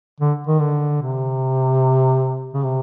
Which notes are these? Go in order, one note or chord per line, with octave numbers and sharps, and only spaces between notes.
D3
D#3
D3
C3
C#3
C3